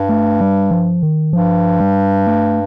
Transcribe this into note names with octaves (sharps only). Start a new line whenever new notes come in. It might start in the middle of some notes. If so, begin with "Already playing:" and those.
Already playing: G2
A3
G3
F3
D#3
G2 F3
G3
A3